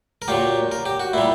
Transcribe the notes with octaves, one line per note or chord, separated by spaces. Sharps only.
A#4
A#2 F#3 G4
A#4
G4
F#4
A#2 G3 E4